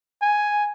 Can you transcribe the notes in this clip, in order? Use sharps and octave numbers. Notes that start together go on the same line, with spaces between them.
G#5